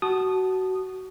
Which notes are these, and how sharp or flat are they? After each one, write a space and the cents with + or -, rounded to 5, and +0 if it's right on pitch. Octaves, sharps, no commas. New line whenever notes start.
F#4 +20 A5 -10 D#6 -20